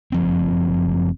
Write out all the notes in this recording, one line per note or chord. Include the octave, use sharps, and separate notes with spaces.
F#1 F3 C4